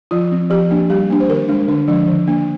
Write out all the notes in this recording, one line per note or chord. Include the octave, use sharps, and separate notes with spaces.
F3 F4
C4
F3 G4
A#3 D4
G3 G4
A#3 D4
C5
D#3 A#4
G#3 D4
D3 D4
F3 G#3 D4
D#3
A#3 D4